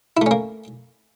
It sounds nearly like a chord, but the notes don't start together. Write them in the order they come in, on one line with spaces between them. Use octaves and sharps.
E4 A3 C#4 A#3